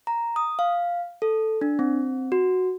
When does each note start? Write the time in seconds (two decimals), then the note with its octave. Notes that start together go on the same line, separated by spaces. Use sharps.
0.07 A#5
0.36 D#6
0.59 F5
1.22 A4
1.61 D4
1.79 C4
2.32 F#4